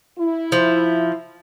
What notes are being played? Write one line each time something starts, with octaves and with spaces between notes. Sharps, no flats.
E4
F3